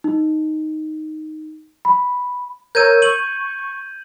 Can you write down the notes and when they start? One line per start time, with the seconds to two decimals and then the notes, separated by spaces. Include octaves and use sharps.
0.04 D#4
1.85 B5
2.75 A#4 C#5 E6 G6 G#6 D#7
3.02 C#6 D#7 F#7